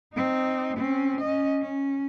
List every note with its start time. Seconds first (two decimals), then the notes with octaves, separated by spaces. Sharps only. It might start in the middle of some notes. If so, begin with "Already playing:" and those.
0.14 C4 D#4
0.77 C4 C#4
1.21 C#4 D#5
1.62 C#4